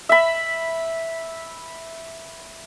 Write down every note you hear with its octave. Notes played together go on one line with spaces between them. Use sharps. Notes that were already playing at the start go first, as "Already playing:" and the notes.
E5 B5